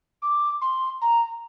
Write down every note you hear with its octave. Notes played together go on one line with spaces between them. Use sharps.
D6
C6
A#5